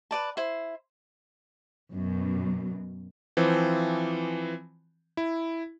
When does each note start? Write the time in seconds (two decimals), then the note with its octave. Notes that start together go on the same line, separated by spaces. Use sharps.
0.11 B4 D5 A5
0.37 E4 C5
1.92 F#2 B2
3.37 E3 F3 C4
5.17 E4